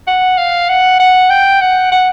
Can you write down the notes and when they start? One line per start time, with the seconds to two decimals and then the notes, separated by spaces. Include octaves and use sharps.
0.07 F#5
0.38 F5
0.69 F#5
0.99 F#5
1.30 G5
1.61 F#5
1.92 F#5